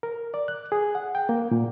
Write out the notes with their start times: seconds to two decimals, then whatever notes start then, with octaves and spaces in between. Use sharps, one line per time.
0.03 A#4
0.34 D5
0.48 F#6
0.72 G#4
0.95 F#5
1.15 G5
1.29 A#3
1.51 A#2